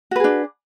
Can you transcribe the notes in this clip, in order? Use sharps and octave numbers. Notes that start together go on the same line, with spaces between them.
D4 F#4 G#4 B4